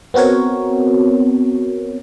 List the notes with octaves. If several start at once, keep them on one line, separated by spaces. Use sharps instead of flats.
B3 C4 F#4 A#4 C#5